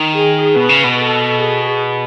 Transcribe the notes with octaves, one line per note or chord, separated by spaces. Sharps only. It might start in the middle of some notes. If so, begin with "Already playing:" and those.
Already playing: D#3
G#4
B2 B4
C#3
B2
A4
G#4